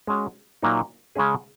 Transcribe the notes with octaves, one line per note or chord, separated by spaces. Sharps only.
G#3 C#4 F#4
A#2 F#3 A#3 D#4
C#3 G#3 C#4 G#4